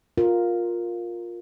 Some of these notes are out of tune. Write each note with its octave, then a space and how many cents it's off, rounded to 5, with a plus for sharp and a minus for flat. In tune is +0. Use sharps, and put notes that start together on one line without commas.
F4 +10 A#4 +0